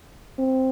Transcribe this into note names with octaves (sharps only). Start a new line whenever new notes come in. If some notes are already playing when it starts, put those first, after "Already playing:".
C4